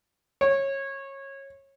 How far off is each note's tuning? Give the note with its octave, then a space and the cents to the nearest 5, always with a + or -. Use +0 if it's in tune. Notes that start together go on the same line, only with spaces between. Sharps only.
C#5 -20